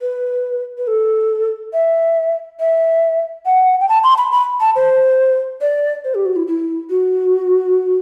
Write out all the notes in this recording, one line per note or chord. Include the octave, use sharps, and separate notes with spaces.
B4
B4
A4
E5
E5
F#5
G5
A5
C6
B5
B5
A5
C5
D5
C5
G4
F#4
E4
E4
F#4